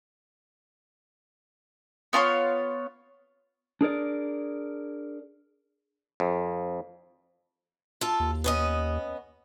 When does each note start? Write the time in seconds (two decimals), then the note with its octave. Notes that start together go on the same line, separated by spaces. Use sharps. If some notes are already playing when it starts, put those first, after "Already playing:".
2.13 B3 F4 A#4 C#5
3.81 D4 G#4 A#4 D5
6.20 F2
8.01 F4 A4
8.20 D#2
8.44 B3 C#4 D#5